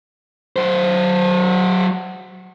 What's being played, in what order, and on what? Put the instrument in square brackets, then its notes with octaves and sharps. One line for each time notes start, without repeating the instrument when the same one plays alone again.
[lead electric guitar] F#3 C5